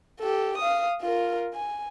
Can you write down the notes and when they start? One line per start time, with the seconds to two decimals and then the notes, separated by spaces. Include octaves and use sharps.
0.20 G4 A4
0.58 F5 D#6
1.01 F4 A#4
1.54 G#5